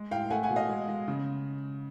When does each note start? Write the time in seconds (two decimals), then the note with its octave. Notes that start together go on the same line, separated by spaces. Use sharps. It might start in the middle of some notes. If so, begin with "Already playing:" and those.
Already playing: G#3
0.11 A2 F5 G5
0.30 A3 F#5 G#5
0.43 F#5 G#5
0.50 B2
0.56 D#5 F5
0.69 G#3
0.88 G#3
1.08 C#3